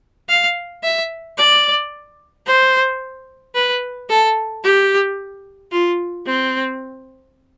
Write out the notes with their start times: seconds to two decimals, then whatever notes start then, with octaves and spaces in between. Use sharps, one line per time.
0.29 F5
0.84 E5
1.38 D5
2.46 C5
3.55 B4
4.10 A4
4.64 G4
5.72 F4
6.27 C4